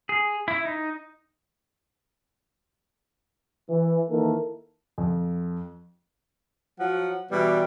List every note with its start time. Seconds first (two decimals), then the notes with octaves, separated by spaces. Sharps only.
0.09 G#4
0.48 E4
0.65 D#4
3.70 E3
4.09 D#3 E3 A#3 E4 A4 A#4
4.98 F2
6.80 F3 F#3 F#5
7.31 B2 E3 G3